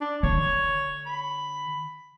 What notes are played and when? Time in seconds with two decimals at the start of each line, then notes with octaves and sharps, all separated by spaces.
0.01 D4
0.23 D3 C#5
1.06 B5